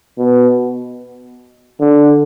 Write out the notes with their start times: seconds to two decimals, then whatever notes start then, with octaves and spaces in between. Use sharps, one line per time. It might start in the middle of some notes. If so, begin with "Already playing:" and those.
0.18 B2
1.81 D3